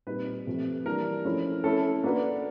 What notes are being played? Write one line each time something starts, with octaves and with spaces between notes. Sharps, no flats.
A#2 G3 C4 D#4 B4
C3 F3 A3
E3 G3 A#3 D4 A#4
F3 A3 C#4 E4
A3 C#4 E4 A4
A#3 D4 F#4 B4